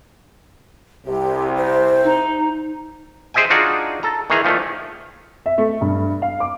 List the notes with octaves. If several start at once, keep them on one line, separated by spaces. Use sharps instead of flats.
C2 C3 G4
C5
D#4
G#4 C5 D#5 E5 G5 G#5
D4 D#4 F4 F#4 G#4
A4 A#5
D#3 E3 G#4 A#5
A#2 D#3 F3 A3
E5
A3
G2
F5
D6